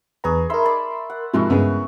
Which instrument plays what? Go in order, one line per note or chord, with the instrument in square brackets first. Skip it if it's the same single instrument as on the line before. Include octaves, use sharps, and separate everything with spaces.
[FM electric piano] E2 B4 A#5 [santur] D4 G#4 C#6
[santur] D#4 E5 B5 [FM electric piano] A#4 C6
[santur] D5 A5 D6
F#5
[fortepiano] G#2 C3 F3 [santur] E4 F#4 A#4
[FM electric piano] G2 G#3 [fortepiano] C#3 B3